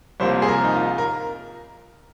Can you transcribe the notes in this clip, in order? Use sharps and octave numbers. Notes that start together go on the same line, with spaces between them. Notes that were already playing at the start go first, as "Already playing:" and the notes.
C2 C3 F3 A#3 C5
G#4
A#4
D#4
F4
A#4